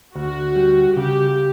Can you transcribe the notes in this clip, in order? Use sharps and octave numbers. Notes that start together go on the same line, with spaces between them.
D2 F#4
G3
C#3 G4